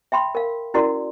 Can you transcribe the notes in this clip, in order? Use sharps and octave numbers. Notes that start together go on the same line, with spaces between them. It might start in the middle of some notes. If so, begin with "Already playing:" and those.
E5 G5 B5 C6
A#4 F5
C#4 E4 F#4 A#4 D5 C6